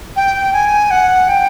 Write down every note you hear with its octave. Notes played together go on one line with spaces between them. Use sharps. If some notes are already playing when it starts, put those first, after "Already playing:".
G5
G#5
F#5
G5